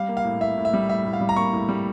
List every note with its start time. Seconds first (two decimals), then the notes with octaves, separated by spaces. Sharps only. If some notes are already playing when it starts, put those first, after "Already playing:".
Already playing: G3 F5
0.09 A#3
0.17 F5
0.25 A2
0.41 A2 E5
0.57 A2
0.65 E5
0.73 G3
0.89 A2 E5
1.05 A2
1.13 F5
1.21 G3
1.29 A#5
1.36 A#3 C#6
1.53 A2
1.69 G3